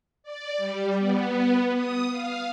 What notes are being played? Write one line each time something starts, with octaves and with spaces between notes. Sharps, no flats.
D5
G3
B3
D#6
F5